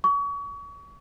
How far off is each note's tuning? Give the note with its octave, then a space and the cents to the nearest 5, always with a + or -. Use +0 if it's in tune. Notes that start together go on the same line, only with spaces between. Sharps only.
C#6 +35